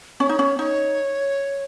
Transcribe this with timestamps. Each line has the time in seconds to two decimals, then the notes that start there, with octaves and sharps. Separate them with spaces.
0.20 C#4 C#5
0.29 D#4
0.39 C#4
0.59 D#4 C#5